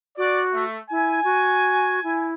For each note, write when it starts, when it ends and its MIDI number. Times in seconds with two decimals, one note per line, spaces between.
0.18 0.65 66
0.18 0.43 74
0.54 0.78 57
0.91 1.21 64
0.91 2.29 80
1.24 2.00 66
2.04 2.34 64